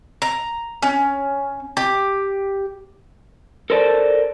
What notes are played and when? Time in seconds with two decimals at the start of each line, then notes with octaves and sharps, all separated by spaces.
0.22 A#5
0.82 C#4
1.77 G4
3.70 A4 A#4 C5 D5 A5